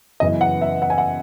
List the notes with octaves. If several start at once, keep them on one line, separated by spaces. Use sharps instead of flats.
F#2 C#3 E3 B3 E4 D#5
F#5
E5
F#5
G#5
F#5